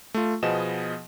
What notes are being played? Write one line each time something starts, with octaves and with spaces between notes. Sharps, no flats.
A3 F4
B2 F3 B3 G#4 D#5 E7